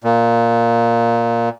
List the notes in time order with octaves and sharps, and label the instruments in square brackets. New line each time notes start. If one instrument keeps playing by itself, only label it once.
[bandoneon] A#2